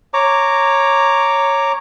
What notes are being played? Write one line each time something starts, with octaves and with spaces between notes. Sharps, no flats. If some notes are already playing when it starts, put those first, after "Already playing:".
C#5 A#5 D6